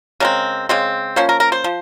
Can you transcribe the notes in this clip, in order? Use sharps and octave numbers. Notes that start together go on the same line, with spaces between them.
C#3 G#3 C4 A#4
C#3 G#3 C4
F3 A#3 C#4 C5
A#4
A#4
C5
F3